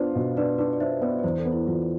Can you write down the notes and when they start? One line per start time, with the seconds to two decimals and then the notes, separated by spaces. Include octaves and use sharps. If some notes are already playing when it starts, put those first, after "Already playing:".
Already playing: B3 D4 F4 B4 C5
0.15 B2
0.37 D4 B4 D5
0.58 D4 B4 D5
0.73 D5
0.80 D4 C5 E5
1.01 B3 B4 D5
1.19 D5
1.24 E2 C5
1.38 A4
1.45 B3
1.52 E4
1.67 E2 F4